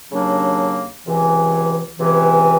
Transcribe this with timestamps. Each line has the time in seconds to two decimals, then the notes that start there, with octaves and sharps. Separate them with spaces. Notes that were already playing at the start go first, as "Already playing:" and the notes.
0.11 D#2 C#3 F#3 A#3 D4
1.05 C#2 C3 E3
1.99 C#2 C3 E3